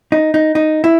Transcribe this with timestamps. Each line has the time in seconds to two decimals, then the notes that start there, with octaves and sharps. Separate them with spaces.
0.12 D#4
0.34 D#4
0.55 D#4
0.84 E4